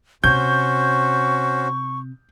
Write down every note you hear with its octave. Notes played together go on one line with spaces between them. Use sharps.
C3 C#4 F#4 C5 C#6 G6